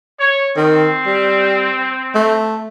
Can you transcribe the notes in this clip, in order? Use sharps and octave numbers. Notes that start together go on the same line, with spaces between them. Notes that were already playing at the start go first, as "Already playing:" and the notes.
C#5
D#3 C4
G3
A3